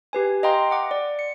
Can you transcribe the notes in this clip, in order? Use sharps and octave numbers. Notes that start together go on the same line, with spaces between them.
G4 B4 G#5
D#5 F5 G5 A#5 C6
F#5 D6
D5
C#7